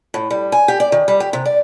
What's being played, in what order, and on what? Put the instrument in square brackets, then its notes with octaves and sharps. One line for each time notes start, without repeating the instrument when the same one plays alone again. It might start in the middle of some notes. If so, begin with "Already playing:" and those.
[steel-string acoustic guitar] A2
G3
G#5
G4
D5
D#3
G3
G4
C3
D5